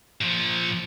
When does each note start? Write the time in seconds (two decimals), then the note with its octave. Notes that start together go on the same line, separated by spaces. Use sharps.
0.21 A#2 F3